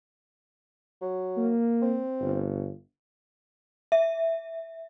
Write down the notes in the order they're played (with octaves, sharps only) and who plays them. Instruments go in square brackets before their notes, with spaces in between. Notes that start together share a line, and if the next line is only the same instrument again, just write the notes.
[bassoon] F#3
[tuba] A#3
[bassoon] C4
[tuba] G1
[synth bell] E5